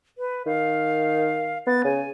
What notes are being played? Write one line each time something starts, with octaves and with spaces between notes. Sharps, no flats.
B4
D#3 F5
B3 A6
C#3 G#5